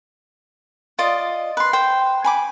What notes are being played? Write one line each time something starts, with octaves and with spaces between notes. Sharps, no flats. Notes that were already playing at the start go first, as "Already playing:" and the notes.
F4 D5 D#5 D#6
B4 C6
C5 G5
G#5 B5 D6